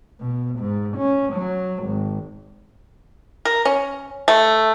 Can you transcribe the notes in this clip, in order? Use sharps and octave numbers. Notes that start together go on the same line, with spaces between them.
B2
G#2
C#4
F#3
G#1
A#4
C#4
A3